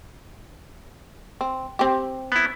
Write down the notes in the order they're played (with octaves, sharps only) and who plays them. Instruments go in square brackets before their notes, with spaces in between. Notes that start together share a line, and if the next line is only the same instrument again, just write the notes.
[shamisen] C4
C4 G4
[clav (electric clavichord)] B3 E4